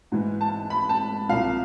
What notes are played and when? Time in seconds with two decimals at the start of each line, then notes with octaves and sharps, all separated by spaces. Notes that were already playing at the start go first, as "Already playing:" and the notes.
0.12 G#2 E3
0.41 A5
0.70 B5
0.89 A5
1.29 C2 C3 F3 F5